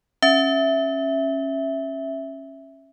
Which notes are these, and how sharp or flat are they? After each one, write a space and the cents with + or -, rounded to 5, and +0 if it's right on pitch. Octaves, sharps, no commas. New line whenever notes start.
C#4 -20 E5 +0